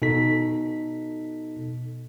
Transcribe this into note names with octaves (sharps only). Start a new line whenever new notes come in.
B2 D#4 A4 B6